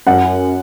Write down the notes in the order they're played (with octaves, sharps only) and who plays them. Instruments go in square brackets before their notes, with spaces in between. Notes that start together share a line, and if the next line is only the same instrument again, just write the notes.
[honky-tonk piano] F#2 [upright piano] F#5